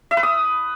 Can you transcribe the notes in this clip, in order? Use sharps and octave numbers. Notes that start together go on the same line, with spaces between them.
E5
B4
D#6